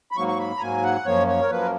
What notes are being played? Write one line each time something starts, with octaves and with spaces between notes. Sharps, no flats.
B5
G#2 F#3 A#3 C#6
C#6
B5
A#5
G#2 F#3 A#3 G#5
F#5
F#2 F3 A#3 C#5
C#5
A#4
F#2 F3 A#3 B4
A#4